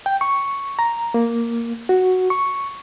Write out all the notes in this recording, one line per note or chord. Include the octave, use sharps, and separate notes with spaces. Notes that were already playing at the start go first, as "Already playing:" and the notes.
G5
C#6
A#5
A#3
F#4
C#6